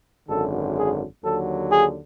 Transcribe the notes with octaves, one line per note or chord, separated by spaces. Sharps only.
G#1 F#2 D3 A4
G#4
D#2 D3 F#3 A4
G#4